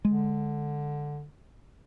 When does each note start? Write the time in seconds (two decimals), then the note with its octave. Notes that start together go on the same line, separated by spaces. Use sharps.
0.05 D3 G#3